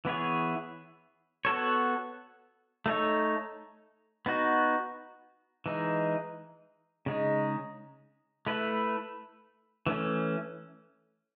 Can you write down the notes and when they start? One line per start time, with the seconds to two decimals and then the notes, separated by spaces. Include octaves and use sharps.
0.05 E3 B3 E4 G#4 C#5
1.45 B3 F#4 A4 C#5
2.86 A3 D#4 A4 C#5
4.26 B3 D#4 F#4
5.66 E3 G#3 D#4
7.06 C#3 G#3 D#4
8.47 A3 E4 B4
9.87 E3 A3 C#4